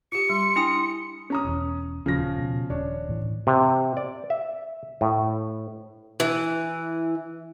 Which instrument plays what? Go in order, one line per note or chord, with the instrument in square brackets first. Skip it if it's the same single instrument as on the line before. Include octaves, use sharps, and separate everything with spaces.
[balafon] F4 G4 [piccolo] C#7
[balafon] G3 [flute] C6
[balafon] D4 G5 G#5 [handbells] E4 D#6
[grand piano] C#4 A#5 D#6
[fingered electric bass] E1 E2
[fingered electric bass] D#1 [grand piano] C#3 F3 A#6
[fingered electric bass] B2
[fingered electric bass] D#1 [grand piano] D4 C#5
[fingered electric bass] A2 E3
[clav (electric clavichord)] C3
D5
E5
A2
[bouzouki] E3